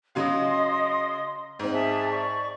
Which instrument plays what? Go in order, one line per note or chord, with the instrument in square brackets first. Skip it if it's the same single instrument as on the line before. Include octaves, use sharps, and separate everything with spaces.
[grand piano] C#3 F#3 F5 [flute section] D#5 C6 D#6
[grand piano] G#2 C4
[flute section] G#4 E5 A5
D5 C#6